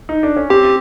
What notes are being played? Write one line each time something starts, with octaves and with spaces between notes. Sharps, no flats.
D#4
D4
C#4
C4 G4